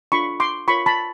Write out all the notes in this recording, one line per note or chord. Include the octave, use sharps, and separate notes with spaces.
D4 F4 A4 B5 C#6
C6 D6
F4 A#4 C#5 B5 C#6
A5 B5